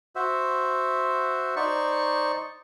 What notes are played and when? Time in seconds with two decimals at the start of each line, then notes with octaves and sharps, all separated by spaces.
0.16 F#4 C5 E5
1.56 D#4 C5 D5 C#6